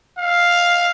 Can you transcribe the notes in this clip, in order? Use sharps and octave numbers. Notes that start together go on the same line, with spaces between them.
F5